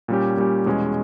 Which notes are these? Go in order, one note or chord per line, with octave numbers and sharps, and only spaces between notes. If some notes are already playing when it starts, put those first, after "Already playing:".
A#2 G3 C#4 G4
A#2 G3 C#4 G4
E2 B2 G#3 C#4